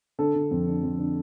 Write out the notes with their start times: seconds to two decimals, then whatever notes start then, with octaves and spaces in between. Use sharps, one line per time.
0.19 D3 A4
0.35 D3
0.51 F2
0.67 D3
0.83 F2
0.99 D3